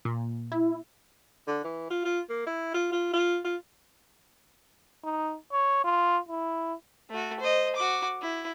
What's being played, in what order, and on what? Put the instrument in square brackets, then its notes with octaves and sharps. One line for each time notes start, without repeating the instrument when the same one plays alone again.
[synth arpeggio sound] A#2
[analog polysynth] E4
[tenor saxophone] D3
E3
F4
F4
A#3
E4
F4
F4
F4
F4
[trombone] D#4
C#5
F4
E4
[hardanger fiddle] A3 F#4
C5 D#5
F#4 D6
E4